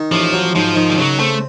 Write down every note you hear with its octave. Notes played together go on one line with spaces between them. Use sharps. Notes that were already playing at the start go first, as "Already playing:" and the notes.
Already playing: D#3
A1 F3
F#3
G#2 F3
D#3
G3
C#3 F#3
A3 C4